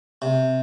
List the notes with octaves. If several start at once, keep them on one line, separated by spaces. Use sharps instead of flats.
C3